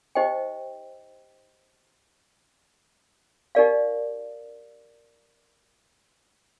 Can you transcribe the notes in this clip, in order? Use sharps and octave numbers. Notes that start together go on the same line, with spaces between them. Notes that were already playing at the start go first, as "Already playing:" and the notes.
D#4 G4 C5 D#5 G5
D#4 G4 A#4 D5 F5